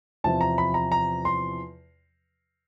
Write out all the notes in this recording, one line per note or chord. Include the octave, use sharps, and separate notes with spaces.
E2 C3 F3 A5
A#5
B5
A#5
A#5
C6